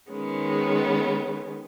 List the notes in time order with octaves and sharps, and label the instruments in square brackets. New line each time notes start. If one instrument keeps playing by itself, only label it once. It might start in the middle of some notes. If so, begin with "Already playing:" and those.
[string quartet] D#3 G#3 B3 C#4